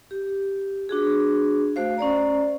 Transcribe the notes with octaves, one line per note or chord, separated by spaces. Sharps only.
G4
D4 F#4 G#4
A3 F#4 C5 F5
C#4 C5 D5 A#5